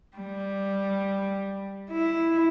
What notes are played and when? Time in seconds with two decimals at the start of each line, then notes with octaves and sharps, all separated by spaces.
0.17 G3
1.91 E4